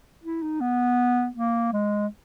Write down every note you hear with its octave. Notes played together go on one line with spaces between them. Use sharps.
E4
D#4
B3
A#3
G#3